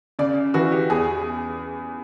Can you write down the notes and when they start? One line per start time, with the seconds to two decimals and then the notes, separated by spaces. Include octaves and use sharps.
0.19 C#3 D5
0.54 E3 F#4
0.72 G4
0.90 E2 G#4